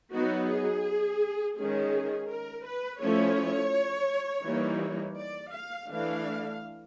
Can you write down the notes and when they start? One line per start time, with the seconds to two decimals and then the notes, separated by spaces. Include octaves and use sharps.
0.14 F#3 B3 D#4 F#4
0.51 G#4
1.58 D#3 G#3 C#4 G#4
2.31 A#4
2.66 B4
3.03 F3 A3 C#4 E4 C#5
4.47 E3 G3 A#3 D#4
5.18 D5
5.55 F5
5.90 E3 A3 D4 F5